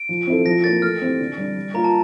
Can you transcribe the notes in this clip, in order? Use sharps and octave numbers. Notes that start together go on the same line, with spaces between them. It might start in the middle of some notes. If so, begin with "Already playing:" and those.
Already playing: D7
F3
C4 E4 A4
F3 A#6
A#3 E4 A#4 A6
A3 F6
C4 E4 G4
D3
G3 D4
G3
A#3 F4 A#5
A5